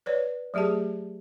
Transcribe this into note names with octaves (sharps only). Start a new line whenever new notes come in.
B4 C#5 D5
F#3 A3 G4 G#4 A5